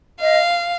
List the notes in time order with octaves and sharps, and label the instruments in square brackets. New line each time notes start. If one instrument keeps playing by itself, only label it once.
[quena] D#5 [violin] F5